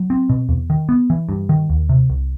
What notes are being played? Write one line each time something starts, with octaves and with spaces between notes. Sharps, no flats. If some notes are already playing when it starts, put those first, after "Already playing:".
Already playing: F#3
C4
B2
E2
D#3
B3
E3
G2
D#3
D#2
C3
C2